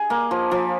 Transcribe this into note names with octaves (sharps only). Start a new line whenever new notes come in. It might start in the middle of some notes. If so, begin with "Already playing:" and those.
Already playing: G#4
A#3
F3
F3